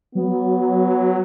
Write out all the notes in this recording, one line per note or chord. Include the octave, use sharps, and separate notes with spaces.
F#3 B3